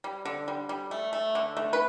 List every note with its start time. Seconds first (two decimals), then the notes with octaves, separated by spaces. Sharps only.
0.04 G3
0.25 D3
0.48 G3
0.69 G3
0.91 A3
1.13 A3
1.35 D3
1.57 A3
1.73 B4